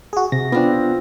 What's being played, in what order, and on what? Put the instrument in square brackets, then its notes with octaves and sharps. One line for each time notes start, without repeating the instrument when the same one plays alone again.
[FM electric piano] F#4 G#4
[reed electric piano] C3 [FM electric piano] A#6
[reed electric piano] B3 D4 [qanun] C4 F4